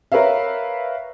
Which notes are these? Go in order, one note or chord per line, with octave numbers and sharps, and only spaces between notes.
A#4 B4 C#5 E5 F5